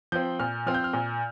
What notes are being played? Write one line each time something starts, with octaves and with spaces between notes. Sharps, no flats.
F3 C4 G6
A#2 F6
F3 C4 F6
G6
F6
A#2